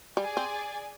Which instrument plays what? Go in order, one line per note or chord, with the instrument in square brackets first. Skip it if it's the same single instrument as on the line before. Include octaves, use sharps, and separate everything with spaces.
[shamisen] G3 [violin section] G#4 D5 G#5
[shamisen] C4